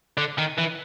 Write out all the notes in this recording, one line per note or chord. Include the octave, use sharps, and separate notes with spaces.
D3
D#3
E3